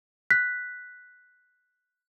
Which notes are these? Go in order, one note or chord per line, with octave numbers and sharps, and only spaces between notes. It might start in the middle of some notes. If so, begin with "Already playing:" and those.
F#6 B6